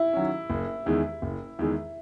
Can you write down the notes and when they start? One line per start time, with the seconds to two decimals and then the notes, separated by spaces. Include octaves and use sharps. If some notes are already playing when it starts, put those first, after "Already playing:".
Already playing: E4
0.13 D#3 F#3 C#4
0.50 F#1
0.86 E2 D#3 G#3
1.22 F#1
1.59 E2 D#3 G#3